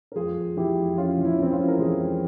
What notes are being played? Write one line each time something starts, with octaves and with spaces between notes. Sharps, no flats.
A#4
F2 F4 G#4
F2
E3 E4 G4
F2
F2 C#4 F4
E3
E4
C#4
E3 C4 E4
C#4 F4
F2
A#4
E3 F4 G#4
F2